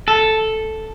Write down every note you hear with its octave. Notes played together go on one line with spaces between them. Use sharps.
A4